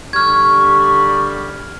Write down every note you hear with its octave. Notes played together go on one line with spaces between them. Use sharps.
D3 G3 C#6 F6 G#6